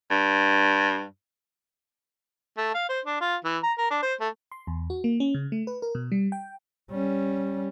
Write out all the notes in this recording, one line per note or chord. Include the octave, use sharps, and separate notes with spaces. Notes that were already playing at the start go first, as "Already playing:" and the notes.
G2
A3
F5
C5
D4
F4
E3
A#5
A#4
D4
C5
A3
C6
E2
F#4
A#3
C#4
C#3
A3
B4
A#4
B2
G3
G5
G3 C#4